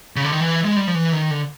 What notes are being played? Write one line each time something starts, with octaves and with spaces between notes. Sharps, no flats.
C#3
D3
D#3
E3
G#3
G3
F3
E3
D#3
D3